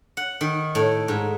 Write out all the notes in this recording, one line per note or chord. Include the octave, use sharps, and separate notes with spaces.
F#5
D#3
A2
G#2